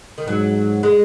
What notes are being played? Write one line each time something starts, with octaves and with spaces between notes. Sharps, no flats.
D#3
G#2 F#3
G#3